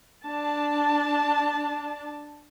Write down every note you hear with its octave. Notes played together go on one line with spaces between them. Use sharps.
D4 A5